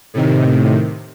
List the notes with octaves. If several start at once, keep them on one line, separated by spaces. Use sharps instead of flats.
A2 C3 D#3